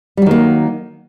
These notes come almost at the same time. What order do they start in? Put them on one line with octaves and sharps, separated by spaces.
G3 F#3 D#3 A#3